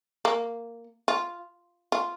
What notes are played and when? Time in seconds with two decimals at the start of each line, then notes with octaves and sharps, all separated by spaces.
0.25 A#3
1.08 F4
1.92 F4